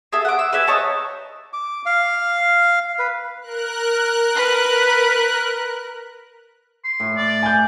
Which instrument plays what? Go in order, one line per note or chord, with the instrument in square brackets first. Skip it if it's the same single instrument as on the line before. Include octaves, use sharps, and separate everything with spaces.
[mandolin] G#4 A4 E5
F#5 D6
E6
B4 D5 E5 G#5
D#4 C#5 A5 A#5
[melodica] D6
F5
B4
[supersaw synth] A#4 F#6
[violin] B4
[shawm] C6
[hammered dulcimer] A2
[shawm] D5
[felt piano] G#5 G6